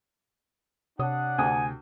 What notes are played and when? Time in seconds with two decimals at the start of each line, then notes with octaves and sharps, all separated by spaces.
0.99 C3 D4 C#5 F#5 D#6
1.38 D2 G5 G#5 D#6